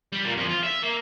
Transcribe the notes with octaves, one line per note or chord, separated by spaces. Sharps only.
G3
A#2 A#3
F2 F3
F4
E5
A#3